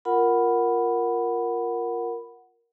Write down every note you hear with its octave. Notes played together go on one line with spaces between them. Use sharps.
F4 A#4 F#5 B5